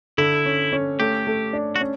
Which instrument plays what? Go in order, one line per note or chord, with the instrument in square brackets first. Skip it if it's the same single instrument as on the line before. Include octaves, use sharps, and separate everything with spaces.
[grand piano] D3 [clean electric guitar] E4
[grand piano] C#4
C#4
[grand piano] A3 [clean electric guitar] G4
[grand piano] A3
D4
[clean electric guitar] F#4
[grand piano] C#4